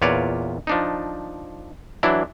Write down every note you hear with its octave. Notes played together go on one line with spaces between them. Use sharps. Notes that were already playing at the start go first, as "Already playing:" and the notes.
E2 A#2 F4 B4 C#5 D5
F3 D4 D#4
E3 F#3 D4 E4